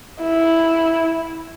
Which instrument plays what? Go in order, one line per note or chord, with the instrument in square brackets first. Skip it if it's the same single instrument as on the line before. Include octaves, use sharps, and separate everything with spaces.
[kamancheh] E4